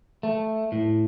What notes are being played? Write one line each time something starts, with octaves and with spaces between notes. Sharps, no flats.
A3
A2